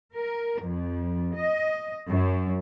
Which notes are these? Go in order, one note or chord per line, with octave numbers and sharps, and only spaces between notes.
A#4
F2
D#5
F#2